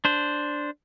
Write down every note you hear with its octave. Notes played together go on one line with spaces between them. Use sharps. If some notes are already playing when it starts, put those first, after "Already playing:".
D4 C5